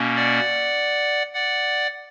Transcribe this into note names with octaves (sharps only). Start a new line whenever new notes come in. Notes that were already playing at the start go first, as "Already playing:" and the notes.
Already playing: B2 A#3 C#4
D5 F#5
D5 F#5